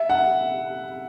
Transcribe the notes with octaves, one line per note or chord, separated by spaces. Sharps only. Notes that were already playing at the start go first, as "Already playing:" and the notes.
Already playing: E5
F#5